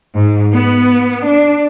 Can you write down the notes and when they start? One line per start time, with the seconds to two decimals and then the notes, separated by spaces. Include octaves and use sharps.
0.14 G#2
0.52 B3
1.25 D4